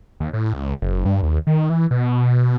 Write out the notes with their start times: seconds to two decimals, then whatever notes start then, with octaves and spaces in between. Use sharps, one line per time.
0.20 D#2
0.33 A2
0.53 C#2
0.82 F#1
1.05 G2
1.23 D#2
1.47 D#3
1.70 E3
1.91 B2